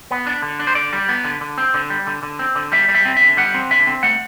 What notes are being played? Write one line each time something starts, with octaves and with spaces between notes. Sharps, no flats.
B3
D4
D3
D4
C5
D3 D5
G3
B3
D3
D3
C4
D3
G3
D3
D3
C4
D3
G3 E5
G3
E5
C4
D3 E5
G3 F#5
C4
D3 E5
C4
A3 F#5